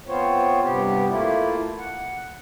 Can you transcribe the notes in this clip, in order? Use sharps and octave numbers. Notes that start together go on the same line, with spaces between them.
B3 C4 F4 C5 C#5
G2 C3 B3 G4
A3 A#3 E4 F4
F#5